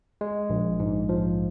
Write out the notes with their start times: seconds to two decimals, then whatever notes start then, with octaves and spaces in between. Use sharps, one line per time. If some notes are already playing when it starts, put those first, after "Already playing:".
0.21 G#3
0.50 A#1
0.80 G#2
1.09 F3